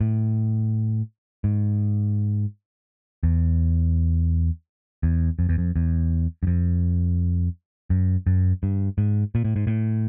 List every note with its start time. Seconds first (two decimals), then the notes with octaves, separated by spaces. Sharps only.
0.01 A2
1.44 G#2
3.23 E2
5.03 E2
5.39 F2
5.49 E2
5.58 F2
5.76 E2
6.43 F#2
6.47 F2
7.90 F#2
8.27 F#2
8.63 G2
8.98 G#2
9.35 A#2
9.44 A2
9.56 G#2
9.67 A2